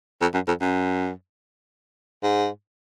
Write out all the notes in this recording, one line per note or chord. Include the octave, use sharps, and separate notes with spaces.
F2
F#2
F2
F#2
G#2